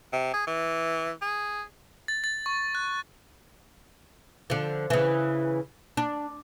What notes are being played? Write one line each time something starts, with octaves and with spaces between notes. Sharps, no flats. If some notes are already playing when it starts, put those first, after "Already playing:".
C3
G#4
E3
G#4
A6
A6
C#6
F#6
D3 F3
C#3 E3
D4